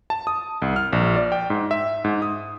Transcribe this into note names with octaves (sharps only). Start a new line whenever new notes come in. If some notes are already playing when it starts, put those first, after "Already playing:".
A5
D#6
C2
F6
A#1
D5
G5
G#2
E5
G#2
D#6